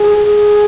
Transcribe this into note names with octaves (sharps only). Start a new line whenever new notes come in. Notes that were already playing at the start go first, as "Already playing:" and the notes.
Already playing: G#4